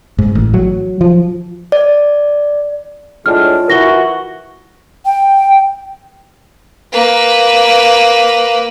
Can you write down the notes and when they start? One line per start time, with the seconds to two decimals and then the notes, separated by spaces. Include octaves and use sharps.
0.19 G#2
0.35 A1
0.54 F#3
1.01 F3
1.72 D5
3.26 A2 G#3 D4 F4 F6
3.68 E3 E4 F#4 A#4 A#6 G7
5.05 G5
6.93 A#3 B4